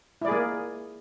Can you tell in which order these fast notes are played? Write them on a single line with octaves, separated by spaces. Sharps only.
E4 D5 G#4 A#3